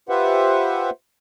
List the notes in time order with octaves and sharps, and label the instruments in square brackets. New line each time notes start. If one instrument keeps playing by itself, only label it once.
[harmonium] F4 G4 B4 C5 E5 F#5